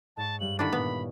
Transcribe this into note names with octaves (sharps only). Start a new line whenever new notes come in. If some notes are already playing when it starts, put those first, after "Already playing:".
G#2 C#5 A5
G2 G3 F#7
D3 D#3 D4 E4 C#5 B5
G2 A#2 B3